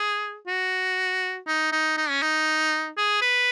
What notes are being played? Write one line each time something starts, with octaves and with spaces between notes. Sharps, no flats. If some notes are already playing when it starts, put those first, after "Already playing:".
Already playing: G#4
F#4
D#4
D#4
D#4
C#4
D#4
G#4
B4